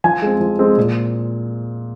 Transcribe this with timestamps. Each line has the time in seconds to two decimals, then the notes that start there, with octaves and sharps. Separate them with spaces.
0.04 F3 G#5
0.22 G#3 C4
0.40 F3
0.59 G#3 C4
0.77 A#2